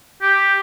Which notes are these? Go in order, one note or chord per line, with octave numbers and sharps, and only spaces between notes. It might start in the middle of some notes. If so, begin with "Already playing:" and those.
G4